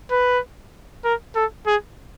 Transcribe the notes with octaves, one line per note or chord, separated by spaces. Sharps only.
B4
A#4
A4
G#4